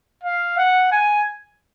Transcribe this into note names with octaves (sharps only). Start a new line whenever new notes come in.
F5
F#5
G#5